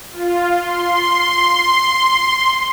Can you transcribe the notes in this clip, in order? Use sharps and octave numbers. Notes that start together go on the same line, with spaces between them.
F4
C6